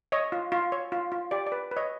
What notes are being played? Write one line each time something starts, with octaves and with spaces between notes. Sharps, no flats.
C#5 D#5
F4
F4
C#5
F4
F4
G4 D5
D5
B4
B4
C#5 D#5